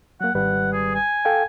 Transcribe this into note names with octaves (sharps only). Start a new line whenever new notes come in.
F#3 A#3 F#5
G#1 G3 B4 F#5
G#4
G#5
A4 F5 G5